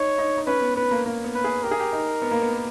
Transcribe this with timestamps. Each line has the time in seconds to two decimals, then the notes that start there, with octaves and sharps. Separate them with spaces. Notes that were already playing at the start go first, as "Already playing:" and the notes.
Already playing: D#4 C#5
0.18 D#4
0.37 D#4
0.46 C#4 B4
0.61 B3
0.76 B3 B4
0.91 A#3
1.06 A#3
1.24 B3
1.34 B4
1.44 G#4
1.63 G4 A#4
1.71 G#4
1.80 G4
1.92 D#4
2.22 B3
2.31 A#3
2.42 B3